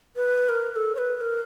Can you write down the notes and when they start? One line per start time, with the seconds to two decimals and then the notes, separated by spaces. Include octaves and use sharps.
0.16 B4
0.49 A#4
0.72 A#4
0.76 A4
0.95 C#5
0.98 B4
1.17 B4
1.21 A#4